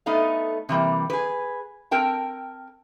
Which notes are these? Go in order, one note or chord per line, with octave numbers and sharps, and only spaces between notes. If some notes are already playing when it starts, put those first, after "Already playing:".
A3 B3 D#4 D#5 F5
C3 E3 G3 A#3
G#4 B4
C4 A#4 G5 A5